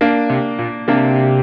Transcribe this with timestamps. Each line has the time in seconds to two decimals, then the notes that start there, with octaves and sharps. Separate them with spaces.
0.01 A#3 D4
0.30 C3
0.59 A#2
0.88 C3 A#3 D4